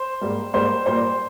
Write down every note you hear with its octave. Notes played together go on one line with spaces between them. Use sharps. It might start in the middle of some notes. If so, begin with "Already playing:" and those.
Already playing: C5 C6
G#2 G3 A#3
G#2 G3 A#3 C5 C6
A#2 G3 A#3 C5 C6